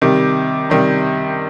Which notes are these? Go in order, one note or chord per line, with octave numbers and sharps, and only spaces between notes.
C3 D#3 G3
C3 D#3 G3